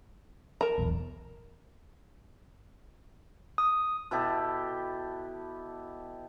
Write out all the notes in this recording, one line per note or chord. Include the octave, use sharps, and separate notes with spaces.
A#4 A5 A#5
D#1 B1 E2
D#6
B2 E4 G4 A4